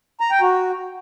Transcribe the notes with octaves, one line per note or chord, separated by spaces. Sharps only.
A#5
G5
F#4